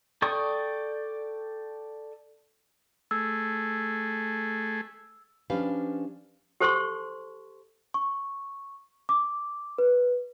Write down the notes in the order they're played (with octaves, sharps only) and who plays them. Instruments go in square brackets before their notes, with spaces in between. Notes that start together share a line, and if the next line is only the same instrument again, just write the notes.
[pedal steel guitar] A4 D5 G5 C#6 D#6
[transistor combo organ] A3 G#4 [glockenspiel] E6
[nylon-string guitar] F3 C#4 D4 G4 B4 F5
[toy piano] G4 A4 C5 A5 C6 C#6
[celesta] C#6
D6
B4